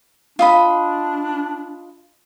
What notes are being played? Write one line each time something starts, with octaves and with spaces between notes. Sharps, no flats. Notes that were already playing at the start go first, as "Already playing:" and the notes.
D4 F4 D#5 B5